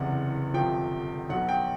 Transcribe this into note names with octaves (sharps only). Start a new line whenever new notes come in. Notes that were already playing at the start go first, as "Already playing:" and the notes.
Already playing: F#1 E2 C3 E3 F#5
G1 F2 C3 F3 G5
B1 B2 F#3 F#5
G5